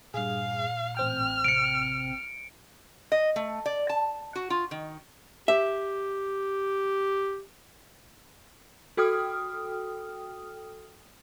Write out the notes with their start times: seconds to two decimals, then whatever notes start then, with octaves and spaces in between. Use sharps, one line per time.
0.14 G2 A#2 G#4 F5
0.97 A1 C4 G5 F6
1.44 C3 C#7 D7
3.12 D#5
3.36 A3
3.66 D5
3.89 A5
4.35 F#4
4.50 F4
4.71 D#3
5.48 G4 E5
8.97 F#4 A4 G5 D#6 F6